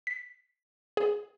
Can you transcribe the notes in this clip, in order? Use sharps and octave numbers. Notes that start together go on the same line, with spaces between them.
B6
G#4